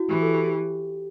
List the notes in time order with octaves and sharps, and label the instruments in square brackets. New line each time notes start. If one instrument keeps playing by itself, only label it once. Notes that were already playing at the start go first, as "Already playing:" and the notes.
Already playing: [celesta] E4 F#4
[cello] E3 [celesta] G4
[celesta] A4
G4
G4